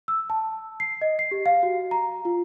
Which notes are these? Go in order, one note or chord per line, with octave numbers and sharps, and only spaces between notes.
E6
A5
C7
D#5
C7
G4
F5
F#4
A#5
F4